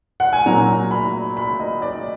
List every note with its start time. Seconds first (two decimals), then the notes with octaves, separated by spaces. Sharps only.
0.20 F#5
0.33 G#5
0.46 A#2 F#3 A#5
0.91 B5
1.37 B5
1.59 D#5
1.82 D5